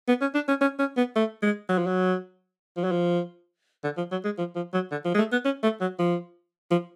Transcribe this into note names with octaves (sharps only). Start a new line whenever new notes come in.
B3
C#4
D4
C#4
C#4
C#4
B3
A3
G#3
F#3
F3
F#3
F3
F#3
F3
D3
F3
F#3
G#3
F3
F3
F#3
D3
F3
G#3
A3
B3
C#4
A3
F#3
F3
F3